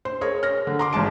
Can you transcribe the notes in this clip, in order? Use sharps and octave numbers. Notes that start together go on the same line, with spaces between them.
C5
G#4 A#4 C#5
F6 A#6
D3
A#5 C6 D6
G#1 G#3 A5 D7